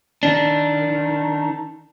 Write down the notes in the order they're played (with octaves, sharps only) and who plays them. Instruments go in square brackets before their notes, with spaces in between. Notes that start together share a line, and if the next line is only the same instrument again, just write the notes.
[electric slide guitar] D#3 D4